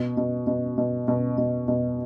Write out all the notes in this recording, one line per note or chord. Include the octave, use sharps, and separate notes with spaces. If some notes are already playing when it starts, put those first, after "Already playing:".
Already playing: B2
B2
B2
B2
B2
B2
B2